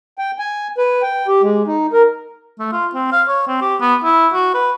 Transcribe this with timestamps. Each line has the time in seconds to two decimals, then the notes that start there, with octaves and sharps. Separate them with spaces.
0.18 G5
0.39 G#5
0.78 B4
1.02 G5
1.28 G4
1.42 G#3
1.67 D#4
1.93 A#4
2.59 A3
2.72 F4
2.94 C4
3.12 F5
3.28 C#5
3.47 C4
3.61 G4
3.81 B3
4.04 E4
4.33 F#4
4.54 B4